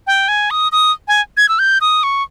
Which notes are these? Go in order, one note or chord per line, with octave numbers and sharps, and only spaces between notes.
G5
G#5
D#6
D#6
G#5
G#6
E6
G6
D#6
C#6